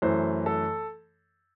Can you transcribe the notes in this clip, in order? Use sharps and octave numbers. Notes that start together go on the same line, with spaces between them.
F#2 E3 A3 C5
A4